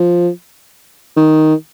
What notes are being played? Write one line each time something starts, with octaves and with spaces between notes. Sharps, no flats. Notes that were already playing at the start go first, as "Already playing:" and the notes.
Already playing: F3
D#3